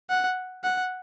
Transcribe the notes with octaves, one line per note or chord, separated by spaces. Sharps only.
F#5
F#5